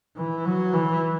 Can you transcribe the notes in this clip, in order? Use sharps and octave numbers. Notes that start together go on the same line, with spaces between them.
E3
F#3
E3